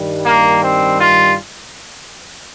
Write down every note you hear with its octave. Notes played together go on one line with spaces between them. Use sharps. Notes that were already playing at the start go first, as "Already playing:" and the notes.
Already playing: G2 D#3 G3
A#3
C4
F4